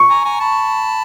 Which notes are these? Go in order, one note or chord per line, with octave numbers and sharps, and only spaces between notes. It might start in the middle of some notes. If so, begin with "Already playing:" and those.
Already playing: C#6
G#5 A#5
G#5 A#5
A5 B5